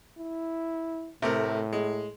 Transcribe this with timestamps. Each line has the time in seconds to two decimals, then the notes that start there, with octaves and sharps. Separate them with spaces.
0.19 E4
1.22 A2 C3 A3 A#4
1.73 G#3